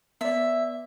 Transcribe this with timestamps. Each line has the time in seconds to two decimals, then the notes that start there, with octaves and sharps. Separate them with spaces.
0.21 B3 D5 E5